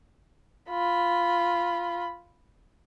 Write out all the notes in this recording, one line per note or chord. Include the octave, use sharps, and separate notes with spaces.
F4 B5